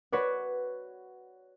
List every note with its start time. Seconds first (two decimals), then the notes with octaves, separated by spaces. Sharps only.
0.12 F#4 B4 C#5 D5